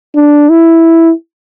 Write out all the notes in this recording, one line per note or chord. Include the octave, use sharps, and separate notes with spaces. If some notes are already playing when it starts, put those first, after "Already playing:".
D4
E4